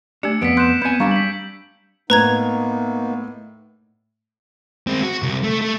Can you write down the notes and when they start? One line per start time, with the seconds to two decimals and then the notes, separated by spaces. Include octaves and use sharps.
0.23 A3 D4 G4 E6 C#7
0.42 F2 B3 B6 D7
0.57 C6 F#6 G6 E7
0.82 B3 C4 G#5 G6 G#6 C#7
1.00 G3 D4 G4 F5 A#5 C#6
1.11 B6 F#7
2.10 A2 A#3 B3 D#4 B4 A#5 G#6
4.87 G#3 C4
5.03 F#4
5.23 C2
5.44 A3
5.61 A3